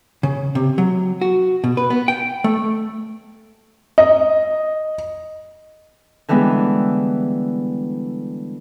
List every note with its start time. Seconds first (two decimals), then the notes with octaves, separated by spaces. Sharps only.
0.23 C#3
0.55 C3
0.78 F#3
1.21 F#4
1.64 B2
1.77 B4
1.90 B3
2.08 G5
2.44 A3
3.98 D#5
6.28 D3 E3 G3 G#3 B3